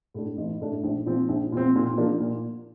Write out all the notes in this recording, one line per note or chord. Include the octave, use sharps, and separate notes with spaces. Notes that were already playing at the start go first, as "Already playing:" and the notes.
A2 A3 D4
A1
A2 A3 D4
A#1
A#2 F3 C4
A#1
A#2 F3 C4
A#2
F3 A#3 D4
A#2